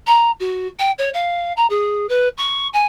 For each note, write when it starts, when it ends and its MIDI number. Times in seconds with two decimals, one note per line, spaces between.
0.07 0.31 82
0.40 0.67 66
0.79 0.91 79
0.98 1.09 73
1.13 1.52 77
1.57 1.66 82
1.70 2.06 68
2.09 2.28 71
2.37 2.68 85
2.73 2.87 80